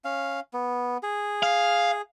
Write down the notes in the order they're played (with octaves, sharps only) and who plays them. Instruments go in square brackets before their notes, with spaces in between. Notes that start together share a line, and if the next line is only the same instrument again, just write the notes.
[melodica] C#4 F5
B3
G#4
[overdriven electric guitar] F5